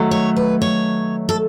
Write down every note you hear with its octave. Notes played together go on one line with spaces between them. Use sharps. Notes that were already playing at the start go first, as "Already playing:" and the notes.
Already playing: D#3 F#3 A3
C#5
B4
C#5
A4